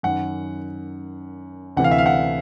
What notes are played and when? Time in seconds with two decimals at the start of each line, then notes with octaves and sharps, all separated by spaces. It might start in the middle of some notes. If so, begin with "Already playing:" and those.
0.03 F#2 D#3 F#5
1.77 D2 C3 E3 F#5
1.84 F5
1.91 E5
1.98 F5
2.06 F#5